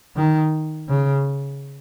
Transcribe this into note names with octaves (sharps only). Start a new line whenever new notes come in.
D#3
C#3